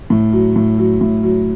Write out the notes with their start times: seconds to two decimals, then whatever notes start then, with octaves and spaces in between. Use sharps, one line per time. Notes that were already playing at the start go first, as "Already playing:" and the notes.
0.10 A2
0.33 F#3
0.56 A2
0.78 F#3
1.01 A2
1.23 F#3